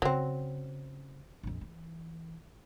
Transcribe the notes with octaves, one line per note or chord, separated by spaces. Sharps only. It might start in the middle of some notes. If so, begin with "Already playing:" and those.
C#3 F#3 C4
A#1 F2
E3